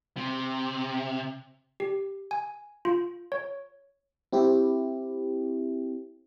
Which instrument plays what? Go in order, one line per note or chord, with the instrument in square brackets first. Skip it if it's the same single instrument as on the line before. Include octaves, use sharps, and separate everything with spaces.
[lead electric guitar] C3
[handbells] G4
G#5
F4
C#5
[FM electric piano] C4 E4 G4